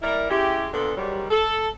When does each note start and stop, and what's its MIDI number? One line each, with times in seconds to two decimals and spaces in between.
0.02 0.29 55
0.02 0.29 58
0.02 0.29 64
0.02 0.29 70
0.02 0.29 74
0.02 0.29 76
0.30 0.67 56
0.30 0.67 61
0.30 0.67 64
0.30 0.67 67
0.72 0.92 46
0.72 0.92 50
0.72 0.92 59
0.72 0.92 62
0.72 0.92 69
0.97 1.25 44
0.97 1.25 51
0.97 1.25 54
0.97 1.25 55
1.30 1.68 69